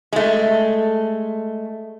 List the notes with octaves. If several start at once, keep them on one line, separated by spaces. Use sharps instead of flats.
G#3 A3